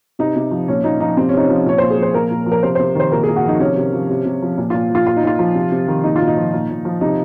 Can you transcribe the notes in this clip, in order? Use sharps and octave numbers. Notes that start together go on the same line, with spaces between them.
C3 D#4
C3
F3
A#2 C#4
A#2 D#4
F3 D#4
C3 C4
C#4
C3 D#4
C#4
F3
A#2 C#5
A#2 C5
G#4
F3 C5
A#2 A#4
A#2
F3
A#4
C3 C5
C3 C5
D#3 C5
A#2 A#4
G#4
A#2
F#4
F3 D#4
C3 C#4
C3
F3
C3
C3
F3
A#2
A#2 F4
F3 F4
A#2 F4
D#4
A#2 F4
F3
C3
C3
D#3
A#2 D#4
A#2 F4
D#4
F3
A#2
A#2
F3
C3 D#4